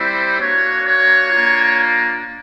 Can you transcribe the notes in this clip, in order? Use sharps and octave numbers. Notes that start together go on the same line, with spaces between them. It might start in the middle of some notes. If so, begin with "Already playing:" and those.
Already playing: G3 C4 E4 C5
A#3 D4 F#4 C#5
C#5
A#3 D4 F4